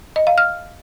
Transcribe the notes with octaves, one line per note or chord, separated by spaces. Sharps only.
D#5
F5
F6